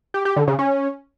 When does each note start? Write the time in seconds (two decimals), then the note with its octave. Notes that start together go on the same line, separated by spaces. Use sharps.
0.14 G4
0.25 G4
0.36 D3
0.48 C#3
0.59 C#4